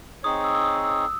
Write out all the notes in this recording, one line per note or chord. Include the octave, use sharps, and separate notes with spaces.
C4 D#4 G#4 C#5 D#6
E6
E6
D#6
E6